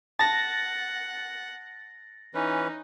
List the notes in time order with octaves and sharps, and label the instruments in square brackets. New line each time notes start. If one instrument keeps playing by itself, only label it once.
[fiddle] F#5 [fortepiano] A5 [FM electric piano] A6 A#6
[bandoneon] E3 C#4 B4 [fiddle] D#4